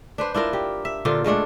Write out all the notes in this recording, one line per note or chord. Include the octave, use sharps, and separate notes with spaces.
D4 B4 C5
D4 E4 F4 A#4
G4
E5
A#2 D3 F4 C5
D3 G#3 A3 D4